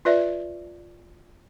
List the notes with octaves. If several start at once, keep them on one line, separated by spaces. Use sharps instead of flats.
F4 B4 D5 E5